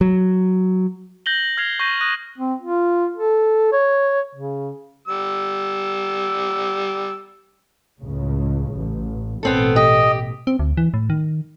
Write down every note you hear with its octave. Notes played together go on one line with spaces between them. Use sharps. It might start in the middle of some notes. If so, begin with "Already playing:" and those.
F#3
G6 A#6 F#7 G7
F6 G#6 C7 F7
C#6 G6 A#6 D#7
D#6 F#6 A#6 D#7
C4
F4
A4
C#5
C#3
G3 E6
C#2 A2 C#3
A1
A1 B2 B3 C4 A4
G4 D#5
C4
D2
E3
A2
D#3